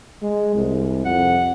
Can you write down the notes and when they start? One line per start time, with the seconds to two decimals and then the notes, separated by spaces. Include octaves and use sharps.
0.22 G#3
0.55 C2
1.05 F2 F#5